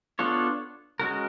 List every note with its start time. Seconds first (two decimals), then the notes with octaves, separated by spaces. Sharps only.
0.19 B3 D4 F4 A4 C#5
1.00 G#3 C#4 F#4 A#4